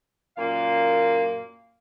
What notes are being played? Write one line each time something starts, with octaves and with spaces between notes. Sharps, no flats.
F#2 A#2 A#3 F5